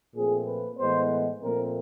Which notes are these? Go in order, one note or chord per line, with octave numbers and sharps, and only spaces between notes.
A#2 F3 A3 C4 G#4
B4
A2 E3 G#3 B3 C5
A#2 F3 A3 C4 A#4